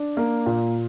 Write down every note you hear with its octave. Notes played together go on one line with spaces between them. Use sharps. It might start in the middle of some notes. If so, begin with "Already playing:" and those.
Already playing: D4
A#3
A#2